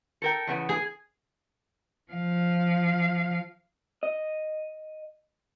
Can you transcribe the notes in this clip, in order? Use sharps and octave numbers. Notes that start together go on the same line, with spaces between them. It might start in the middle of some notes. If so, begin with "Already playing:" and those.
A4 A#4 G5
E2 C#3 B3
G#4
F3 F5
D#5